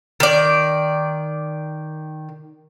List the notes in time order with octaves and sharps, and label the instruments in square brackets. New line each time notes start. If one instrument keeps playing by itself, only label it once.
[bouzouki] D#3 D5